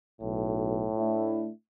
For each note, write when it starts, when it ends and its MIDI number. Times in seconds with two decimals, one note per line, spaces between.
0.21 0.88 35
0.21 1.49 45
0.98 1.49 57
0.98 1.49 62
0.98 1.49 64